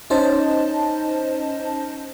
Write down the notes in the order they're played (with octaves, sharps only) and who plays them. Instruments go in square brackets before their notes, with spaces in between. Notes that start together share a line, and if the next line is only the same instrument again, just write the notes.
[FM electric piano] C#4 D#4 C5 D#5 A5